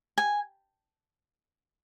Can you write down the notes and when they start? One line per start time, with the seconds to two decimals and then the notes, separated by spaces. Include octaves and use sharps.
0.18 G#5